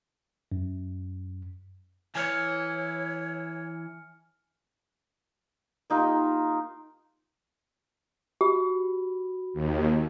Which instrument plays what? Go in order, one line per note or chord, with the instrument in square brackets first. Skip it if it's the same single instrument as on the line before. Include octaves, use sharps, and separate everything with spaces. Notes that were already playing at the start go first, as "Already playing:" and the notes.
[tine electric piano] F#2
[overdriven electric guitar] E3 [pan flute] C#5 [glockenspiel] G#5 F6 C#7
[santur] A#3 D#4 F4 G4
[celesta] F#4 B5 [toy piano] G4
[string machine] D#2